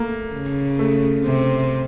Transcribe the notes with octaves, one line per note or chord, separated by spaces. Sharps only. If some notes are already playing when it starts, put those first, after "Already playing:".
Already playing: A3 A#3
C#3
A3
C3